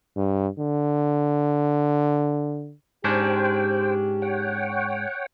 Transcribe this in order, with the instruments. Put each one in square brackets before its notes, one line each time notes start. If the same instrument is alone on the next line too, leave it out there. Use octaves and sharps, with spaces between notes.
[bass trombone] G2
D3
[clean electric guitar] G#2 C#4 D4 [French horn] G4 [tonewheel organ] C5 G5
[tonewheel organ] C#5 F#5 G5